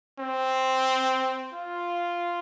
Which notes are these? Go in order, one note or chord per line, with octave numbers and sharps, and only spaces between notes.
C4
F4